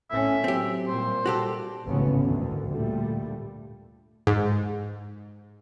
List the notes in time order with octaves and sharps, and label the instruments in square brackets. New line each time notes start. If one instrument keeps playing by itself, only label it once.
[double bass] A2 C#4 [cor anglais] E5
[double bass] F#3 [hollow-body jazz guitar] C4 G4
[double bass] A#2 G3 [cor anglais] C5
[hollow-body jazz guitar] F#4 G4 A4
[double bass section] G#1 D2 C#3 E3 B3 C#4
G#1 D2 A2 D3 D#3
A#2 D3 G3 A3
[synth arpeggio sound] G#2